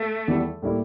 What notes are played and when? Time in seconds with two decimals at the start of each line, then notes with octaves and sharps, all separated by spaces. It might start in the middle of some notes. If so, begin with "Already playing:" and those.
Already playing: A3
0.27 E2 E3 G3
0.62 A2 G3 A#3 E4